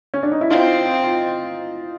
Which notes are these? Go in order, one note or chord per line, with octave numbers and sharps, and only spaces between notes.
C#4
D4
D#4
E4
C4 D#4 F4
F4